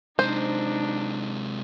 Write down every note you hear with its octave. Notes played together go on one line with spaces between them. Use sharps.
C3 G#3 D4 D#4 C5